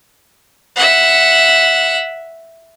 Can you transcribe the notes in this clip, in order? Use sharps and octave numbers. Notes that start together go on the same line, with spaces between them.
E5 F#5